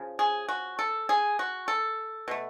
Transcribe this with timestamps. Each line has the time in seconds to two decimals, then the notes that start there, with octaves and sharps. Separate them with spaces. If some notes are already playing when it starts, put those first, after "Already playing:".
Already playing: C#3 F3
0.19 G#4
0.49 F#4
0.79 A4
1.09 G#4
1.39 F#4
1.68 A4
2.28 B2 A3